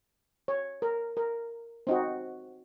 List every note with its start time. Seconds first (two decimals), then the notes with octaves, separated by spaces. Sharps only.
0.48 C#5
0.82 A#4
1.17 A#4
1.87 C4 D#4 F#4